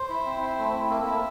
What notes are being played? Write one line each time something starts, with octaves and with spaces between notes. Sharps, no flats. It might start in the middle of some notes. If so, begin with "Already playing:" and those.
Already playing: C5
E4
C4
E4
A3
C4
A#3 A4
E4 A4